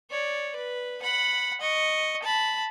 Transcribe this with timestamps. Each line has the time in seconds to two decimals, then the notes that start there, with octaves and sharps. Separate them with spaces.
0.10 C#5 D5
0.56 B4
1.02 F#5 B5
1.61 D#5 C#6
2.22 A5 B5